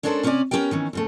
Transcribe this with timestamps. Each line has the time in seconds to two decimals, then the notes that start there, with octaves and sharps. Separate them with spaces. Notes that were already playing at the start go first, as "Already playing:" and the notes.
0.03 G#3 C#4 D4 A4 A#4 C5
0.23 C3 C#4 B4 C#5 D5 G#5
0.51 B3 C#4 D4 G4 A#4 G5
0.71 D#3 E3 C#4
0.93 D#2 C#3 A3